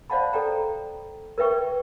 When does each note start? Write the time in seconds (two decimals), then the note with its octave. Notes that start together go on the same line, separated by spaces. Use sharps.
0.10 C5 D5 F5 F#5 A5 B5
0.33 A4 D5 G5 A#5
1.38 A#4 B4 E5 G5 C#6